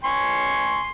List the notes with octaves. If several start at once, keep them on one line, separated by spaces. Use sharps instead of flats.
G#5 C6 C#6